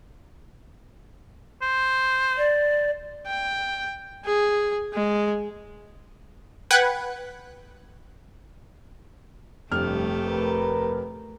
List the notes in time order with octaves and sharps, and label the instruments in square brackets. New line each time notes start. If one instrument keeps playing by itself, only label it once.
[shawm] C5
[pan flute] D5
[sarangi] G5
G#4
G#3
[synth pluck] B4 F#5 G5 F#6 G#6
[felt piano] F1 F6 [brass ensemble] G2 [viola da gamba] A3 G4
[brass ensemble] A#4 B4